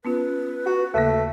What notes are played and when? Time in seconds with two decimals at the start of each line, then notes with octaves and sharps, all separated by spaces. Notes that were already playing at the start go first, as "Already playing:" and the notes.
0.05 B3 C#4 F4 B4
0.66 F#4
0.94 D#2 C#3 A3 A#3